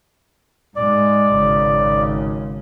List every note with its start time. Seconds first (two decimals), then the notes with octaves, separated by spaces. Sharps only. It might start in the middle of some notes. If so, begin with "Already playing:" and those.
0.76 G#2 G#3 D5
1.33 G#1 C#3